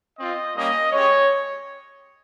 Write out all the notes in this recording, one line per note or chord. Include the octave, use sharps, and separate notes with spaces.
C4 F4 D#5
G3 A#3 C#4 D#5
G#3 C#4 G4 C#5